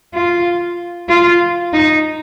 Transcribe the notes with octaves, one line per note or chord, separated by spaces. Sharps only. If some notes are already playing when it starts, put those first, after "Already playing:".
F4
F4
D#4